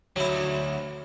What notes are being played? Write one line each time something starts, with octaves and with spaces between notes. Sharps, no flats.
D2 F#3 E4